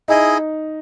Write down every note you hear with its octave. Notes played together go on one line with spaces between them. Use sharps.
D#4 E4 G#4 D#5